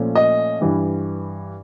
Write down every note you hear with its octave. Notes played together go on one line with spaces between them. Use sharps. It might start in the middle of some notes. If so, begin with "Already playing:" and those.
Already playing: A#2 F3 A3 C#4
D#5
G2 E3 G3